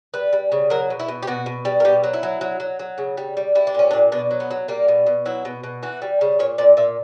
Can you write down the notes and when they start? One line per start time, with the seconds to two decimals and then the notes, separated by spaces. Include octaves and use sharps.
0.14 G3 B4
0.33 G3
0.52 C#3
0.70 F#3 A#4
0.90 B2
1.00 E4
1.08 B2
1.23 G4
1.27 B2 F#4
1.46 B2
1.65 G3
1.80 A#4
1.85 B2 G4
2.04 F#3
2.13 E4
2.23 F#3
2.41 F#3
2.60 F#3
2.79 F#3
2.98 C#3
3.17 G3
3.37 G3
3.55 G3 E4
3.67 D4
3.74 A#2 C#4
3.91 D4
3.93 A#2
4.12 B2 D4
4.31 F#3
4.40 B3
4.51 F#3
4.68 G3 A#3
4.88 B2
5.07 B2
5.26 F#3 E4
5.45 B2
5.63 B2
5.83 E3 F#4
6.02 G3
6.21 C#3
6.39 A#2 C#5
6.58 A#2 D5
6.77 A#2 E5